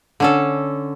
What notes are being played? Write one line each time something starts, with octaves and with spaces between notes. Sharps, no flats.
D3 C#4 A4